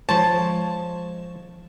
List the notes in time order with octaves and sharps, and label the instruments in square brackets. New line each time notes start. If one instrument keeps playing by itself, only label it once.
[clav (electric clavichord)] F3 C#5 [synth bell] G#3 C#6 E7 [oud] C5 [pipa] A5